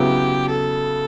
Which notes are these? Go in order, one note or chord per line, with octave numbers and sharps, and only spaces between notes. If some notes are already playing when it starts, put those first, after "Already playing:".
Already playing: C#3 F#3 B3 E4 G4
A4